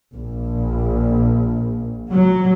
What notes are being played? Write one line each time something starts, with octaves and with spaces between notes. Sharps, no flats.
A#1
F#3